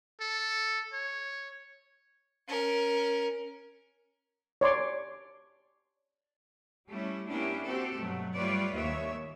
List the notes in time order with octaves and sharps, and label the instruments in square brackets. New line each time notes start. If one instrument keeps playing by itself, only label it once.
[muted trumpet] A4
C#5
[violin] C#4 A#4
[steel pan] C#5 D5 C6 D6
[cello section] G3 A3 C#4 E4
A#3 B3 C#4 D4 E4 G4
C4 F#4 G4 A4
G2 B2 F#3 A3
G3 A3 F4 B4 C#5 D5
D#2 C#5 E5